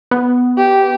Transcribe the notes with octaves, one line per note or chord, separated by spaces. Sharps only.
B3
G4